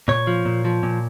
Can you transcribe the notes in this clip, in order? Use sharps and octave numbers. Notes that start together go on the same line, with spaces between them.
A#2 C#5
F3
A#2
F3
A#2